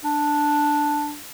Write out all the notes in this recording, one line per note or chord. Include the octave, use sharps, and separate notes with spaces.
D4